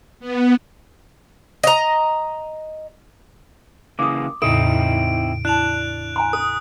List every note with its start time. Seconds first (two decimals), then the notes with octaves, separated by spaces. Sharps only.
0.20 B3
1.64 D#5 A#5
3.99 C#3 E3 A#3 D6 D#6
4.42 E2 A2 C#3 C4 D#4 E4 A4 D7
5.45 D4 E4 A5 F#6 F7
6.16 G#5 A#5 C6
6.33 A4 D#6